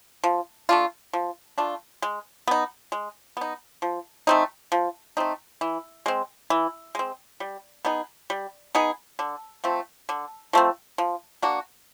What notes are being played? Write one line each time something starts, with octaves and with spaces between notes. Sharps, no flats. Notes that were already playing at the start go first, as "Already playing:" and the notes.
F3
A3 D4 F4
F3
A3 D4 F4
G#3
B3 D#4
G#3
B3 D#4
F3
A3 C4 D#4
F3
A3 C4 D#4
E3
G#3 C4
E3
G#3 C4
G3
B3 D#4 G#4
G3
B3 D#4 G#4
D3
F3 A3 C4
D3
F3 A3 C4
F3
A#3 D4 F#4